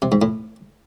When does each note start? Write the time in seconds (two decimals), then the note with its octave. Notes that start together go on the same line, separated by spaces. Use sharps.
0.02 C3
0.12 G#2
0.22 A2